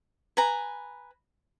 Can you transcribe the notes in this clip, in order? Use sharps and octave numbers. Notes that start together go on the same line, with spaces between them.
B4 G#5 A#5